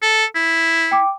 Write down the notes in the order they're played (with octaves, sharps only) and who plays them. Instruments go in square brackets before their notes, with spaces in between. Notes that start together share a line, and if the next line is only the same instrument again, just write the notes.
[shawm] A4
E4
[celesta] G5 D6